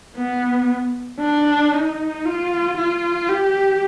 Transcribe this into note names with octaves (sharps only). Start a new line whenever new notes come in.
B3
D4
D#4
F4
F4
G4